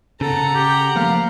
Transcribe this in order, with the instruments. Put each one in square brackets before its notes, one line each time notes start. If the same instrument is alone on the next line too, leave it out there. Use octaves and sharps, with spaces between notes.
[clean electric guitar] C#3 [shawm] A4 [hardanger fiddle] F#5 A#5
[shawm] G4
[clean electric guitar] F3 A3 A#3 [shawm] F5